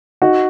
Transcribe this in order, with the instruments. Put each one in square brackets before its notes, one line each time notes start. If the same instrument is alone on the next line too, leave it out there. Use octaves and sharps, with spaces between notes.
[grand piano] D#4 F#4